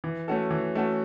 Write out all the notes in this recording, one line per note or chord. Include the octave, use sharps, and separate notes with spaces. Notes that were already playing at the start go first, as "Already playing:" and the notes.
E3
A3 C#4 F#4 A4
E3
A3 C#4 F#4 A4